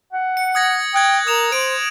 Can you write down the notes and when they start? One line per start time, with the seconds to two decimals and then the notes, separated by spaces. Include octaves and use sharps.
0.13 F#5
0.37 C#7
0.55 D#6 G#6 A#6
0.94 G5 D#6 F#6 G#6
1.27 A#4 D#6 E7 F7
1.52 C5 D7